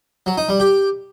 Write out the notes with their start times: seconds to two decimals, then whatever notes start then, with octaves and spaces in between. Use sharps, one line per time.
0.26 F#3
0.38 D#4
0.49 G3
0.60 G4